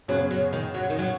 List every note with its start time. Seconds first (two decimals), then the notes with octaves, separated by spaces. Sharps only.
0.08 F#2 C#3 F#3 B3 G#4 C#5
0.31 F#3
0.53 D#3
0.74 F#3
0.90 D#3
0.99 F#3